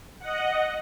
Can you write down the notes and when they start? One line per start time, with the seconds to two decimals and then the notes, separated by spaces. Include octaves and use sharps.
0.19 D#5 F#5